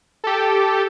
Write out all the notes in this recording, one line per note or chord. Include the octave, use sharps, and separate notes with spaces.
G4 A4